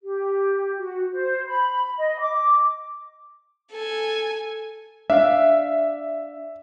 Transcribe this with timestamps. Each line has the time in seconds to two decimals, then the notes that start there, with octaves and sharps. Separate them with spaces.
0.01 G4
0.77 F#4
1.12 C5
1.47 B5
1.98 D#5
2.19 D6
3.72 A4 G#5
5.10 D4 E5 F5